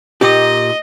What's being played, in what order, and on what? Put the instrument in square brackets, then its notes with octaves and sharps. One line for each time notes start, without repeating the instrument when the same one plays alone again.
[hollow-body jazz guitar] A#2 D#4 G4 [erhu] D#5